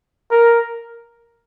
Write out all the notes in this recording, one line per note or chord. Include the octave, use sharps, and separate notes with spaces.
A#4